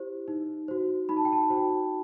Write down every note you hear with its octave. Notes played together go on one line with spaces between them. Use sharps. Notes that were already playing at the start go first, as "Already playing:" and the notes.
Already playing: E4 G4 C5
D#4
F#4 C5
D#4 B5
A5
G5
A5
F#4 C5 G5